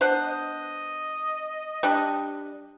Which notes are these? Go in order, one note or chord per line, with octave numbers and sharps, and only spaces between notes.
B3 D4 C5
D#5
G3 D4